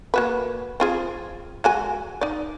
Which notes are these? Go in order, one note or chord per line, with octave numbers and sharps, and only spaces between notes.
A#3 F#4 B4
C4 F4 G#4
G#3 F#4 G#5
D#4 D5